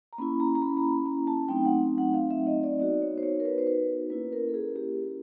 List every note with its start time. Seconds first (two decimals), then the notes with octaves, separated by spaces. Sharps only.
0.13 A#5
0.18 A#3 C#4 E4 B5
0.40 A#5
0.55 A#5
0.62 B5
0.77 A#5
0.84 B5
1.06 A#5
1.27 A5
1.48 F#3 A3 C4 D#4 G5
1.65 F#5
1.98 F#5
2.14 F5
2.31 E5
2.47 D#5
2.63 D5
2.80 B3 D#4 F#4 D5
3.02 C#5
3.18 C5
3.23 C#5
3.40 A#4
3.45 B4
3.58 C5
3.67 B4
4.10 A#3 C#4 E4 B4
4.32 A#4
4.49 A4
4.54 G#4
4.76 G4